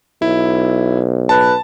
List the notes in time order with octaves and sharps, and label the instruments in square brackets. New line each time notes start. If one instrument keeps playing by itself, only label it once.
[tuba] B1 [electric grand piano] E4
[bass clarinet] B4 [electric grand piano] A5